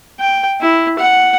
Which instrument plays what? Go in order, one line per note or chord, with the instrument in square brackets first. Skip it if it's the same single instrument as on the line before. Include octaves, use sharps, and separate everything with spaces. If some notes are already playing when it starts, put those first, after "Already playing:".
[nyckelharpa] G5
E4
F#5